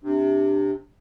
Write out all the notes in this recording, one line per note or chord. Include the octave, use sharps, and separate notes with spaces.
C3 D4